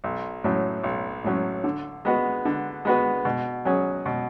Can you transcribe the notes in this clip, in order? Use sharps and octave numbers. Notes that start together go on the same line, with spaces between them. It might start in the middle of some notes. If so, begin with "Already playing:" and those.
B1
A2 F#3 C#4
B1
A2 F#3 C#4
D3
G#3 B3 F#4 B4
D3
G#3 B3 F#4 B4
B2
F#3 C#4 G#4
B2